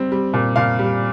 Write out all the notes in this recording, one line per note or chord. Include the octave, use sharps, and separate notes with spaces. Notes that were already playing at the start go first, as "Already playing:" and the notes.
Already playing: G3 C4
G3
A#2
A#2 F5
G3